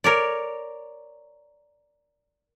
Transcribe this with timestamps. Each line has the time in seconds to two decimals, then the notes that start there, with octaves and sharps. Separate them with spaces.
0.04 A#4 C#5 D5